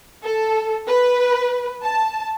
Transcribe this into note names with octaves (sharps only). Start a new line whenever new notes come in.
A4
B4
A5